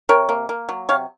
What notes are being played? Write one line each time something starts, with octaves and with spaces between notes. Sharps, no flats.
C3 A#4 C#5
A#3
A#3
F#3
C3 C#5 F5